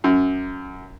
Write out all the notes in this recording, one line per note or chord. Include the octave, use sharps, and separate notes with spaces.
F#2